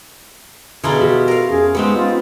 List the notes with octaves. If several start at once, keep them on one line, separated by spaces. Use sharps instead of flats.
B2 D3 E4 F4 G#4 G#5 A#5
F#4 G4
A4 A#4 F5
F2 C#4 G#4
G#3 B3 C4 D#4 G4
F4